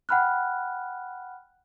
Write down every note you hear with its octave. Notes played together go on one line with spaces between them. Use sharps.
F#5 G5 B5 F6 F#6